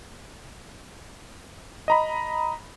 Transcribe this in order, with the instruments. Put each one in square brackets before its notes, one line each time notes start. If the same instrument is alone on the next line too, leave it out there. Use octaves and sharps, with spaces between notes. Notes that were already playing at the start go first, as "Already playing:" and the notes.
[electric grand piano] D#5 A#5 B5